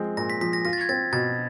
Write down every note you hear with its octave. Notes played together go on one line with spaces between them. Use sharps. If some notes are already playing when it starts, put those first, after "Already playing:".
Already playing: F3 G#3 C4
A#2 A#6
B6
F3 B6
A#6
F4 A#6
A6
G#6
C4 A6
B2 A6